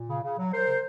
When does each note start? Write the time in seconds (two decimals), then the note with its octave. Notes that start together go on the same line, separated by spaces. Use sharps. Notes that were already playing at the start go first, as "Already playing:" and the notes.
Already playing: A#2
0.09 C#3
0.23 C#3
0.38 F#3
0.52 F#3 A#4 C5
0.68 C#3